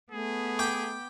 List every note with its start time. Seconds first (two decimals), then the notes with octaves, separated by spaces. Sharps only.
0.12 A3 B3 G#4
0.59 G5 D6